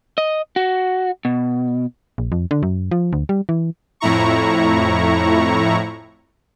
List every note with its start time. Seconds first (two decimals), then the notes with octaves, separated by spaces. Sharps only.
0.18 D#5
0.56 F#4
1.25 B2
2.18 A#1
2.32 F2
2.51 D3
2.63 F#2
2.91 F3
3.13 D2
3.29 G3
3.49 E3
4.00 F2 A2 E4 A#5 C#6